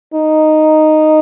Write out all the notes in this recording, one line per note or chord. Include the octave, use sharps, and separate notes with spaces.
D#4